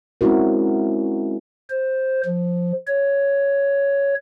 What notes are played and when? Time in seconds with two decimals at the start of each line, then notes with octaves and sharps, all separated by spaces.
0.21 G#3 C4 C#4 E4 F#4 A#4
1.70 C5
2.25 F3
2.88 C#5